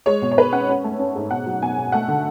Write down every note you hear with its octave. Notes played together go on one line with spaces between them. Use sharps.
G#3 C#5
B2
C#5
B2 B4
C#4 F#5
C#4
A3
C#4
G#2
B2 F#5
F#3
B2 G#5
B2
A3 F#5
D3